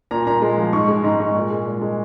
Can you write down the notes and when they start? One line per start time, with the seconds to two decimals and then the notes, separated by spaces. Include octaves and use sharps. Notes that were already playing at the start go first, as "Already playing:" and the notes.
0.11 A#2 A#5
0.27 A#2 A#5
0.42 G#3
0.58 F3
0.73 G#2 C#6
0.88 G#3
1.03 G#2 A#5
1.20 G#3 C#6
1.36 A#2
1.51 G#3
1.67 A#2
1.81 G#3